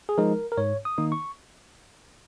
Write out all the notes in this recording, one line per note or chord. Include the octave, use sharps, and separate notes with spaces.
G#4
F3 G#3 D#4 A#4
A#4
G#2 C#5
D#6
D#3 A#3 D#4
C#6